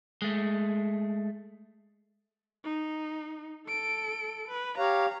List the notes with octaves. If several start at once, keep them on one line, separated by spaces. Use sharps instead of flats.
G#3 A3
D#4
A4 D7
B4
G4 C#5 F5 A#5